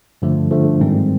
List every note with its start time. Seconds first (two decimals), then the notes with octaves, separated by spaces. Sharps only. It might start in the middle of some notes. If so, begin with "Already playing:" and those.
0.22 G2 D3 F3 A3
0.51 G2 D3 F3 A3
0.81 G#2 D#3 G3 C4